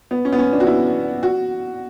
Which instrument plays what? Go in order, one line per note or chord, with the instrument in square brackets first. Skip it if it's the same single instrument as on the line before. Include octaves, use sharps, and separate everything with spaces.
[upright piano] B3
C#4
B3
C#4
D4
F#4
E4
F#4